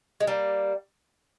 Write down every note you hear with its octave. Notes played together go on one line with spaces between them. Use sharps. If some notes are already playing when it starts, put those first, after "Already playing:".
G#3
G3 A#3